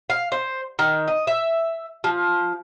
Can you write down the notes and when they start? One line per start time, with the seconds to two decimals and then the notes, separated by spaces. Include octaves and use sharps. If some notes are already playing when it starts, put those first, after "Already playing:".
0.10 F5
0.32 C5
0.79 D#3
1.08 D#5
1.27 E5
2.04 F3